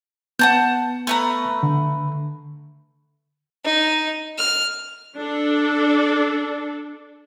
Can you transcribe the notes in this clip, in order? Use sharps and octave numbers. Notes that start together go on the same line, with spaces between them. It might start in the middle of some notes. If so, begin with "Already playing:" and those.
B3 F#5 A5 G6
A3 B4 A#5
D3
D#4
F6
D4 A4